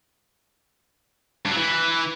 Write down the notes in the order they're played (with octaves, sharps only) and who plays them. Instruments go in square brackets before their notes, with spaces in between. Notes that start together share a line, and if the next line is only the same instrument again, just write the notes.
[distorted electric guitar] G2
F#3
E3